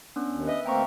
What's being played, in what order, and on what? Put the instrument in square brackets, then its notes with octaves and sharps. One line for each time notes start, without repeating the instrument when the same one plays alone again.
[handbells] B3 C#4 D4
[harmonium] D#2
[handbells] B4 E5 [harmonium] D#5
[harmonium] D2 A#3 C4 [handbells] G5 A#5 C#6